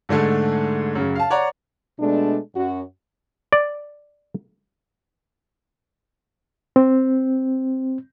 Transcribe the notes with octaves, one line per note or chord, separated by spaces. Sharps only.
G#2 D3 G#3 A3
F#2 C#3
F5 A5
C#5 D5 F#5 A#5
B2 G#3 A3 D4
F#2 F#4
D5
C4